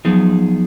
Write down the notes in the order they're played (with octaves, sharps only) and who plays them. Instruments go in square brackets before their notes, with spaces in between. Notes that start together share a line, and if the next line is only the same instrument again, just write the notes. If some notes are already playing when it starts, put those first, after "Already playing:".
[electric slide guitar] F3 B3 D#4 G#4 [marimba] F#3